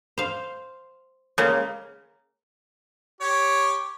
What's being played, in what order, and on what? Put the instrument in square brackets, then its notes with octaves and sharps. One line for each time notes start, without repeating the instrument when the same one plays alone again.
[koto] C5 F5
[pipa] C#3 [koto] G#3 A#3 F#5
[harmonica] G4 C#5